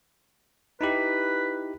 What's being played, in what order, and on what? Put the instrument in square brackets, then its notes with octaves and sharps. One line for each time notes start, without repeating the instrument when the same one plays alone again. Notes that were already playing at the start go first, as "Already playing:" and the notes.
[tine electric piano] D#4 E4 G4 [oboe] B4